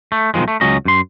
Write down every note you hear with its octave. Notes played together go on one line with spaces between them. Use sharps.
A3
B1 D#3 F3 G#3
A3
C#2 F#3 C#4 D#5
F#2 C6